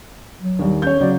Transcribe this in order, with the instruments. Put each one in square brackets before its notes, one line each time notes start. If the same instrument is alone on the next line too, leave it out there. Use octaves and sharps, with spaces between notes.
[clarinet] F#3
[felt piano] D#2 D#3 G3
[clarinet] C#4 [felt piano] C#5 G6
[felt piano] C#3 F#3 [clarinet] D5